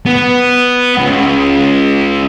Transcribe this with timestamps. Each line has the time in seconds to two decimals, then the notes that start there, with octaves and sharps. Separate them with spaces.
0.06 B3
0.98 C#2